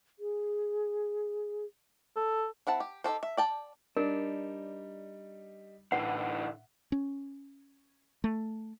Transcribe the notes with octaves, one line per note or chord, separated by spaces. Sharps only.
G#4
A4
C4 E4 F#5 A5
G4
D#4 G4 A4 C5
E5
D5 G5 A5
G3 D4 D#4 A#4
A2 D3 E3 B4 F#5
C#4
A3